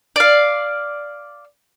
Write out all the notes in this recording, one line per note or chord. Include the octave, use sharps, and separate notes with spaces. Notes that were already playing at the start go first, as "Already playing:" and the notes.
D5 F5